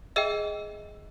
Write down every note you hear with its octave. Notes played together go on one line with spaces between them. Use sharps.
G#4 D#5 E5 G5 E6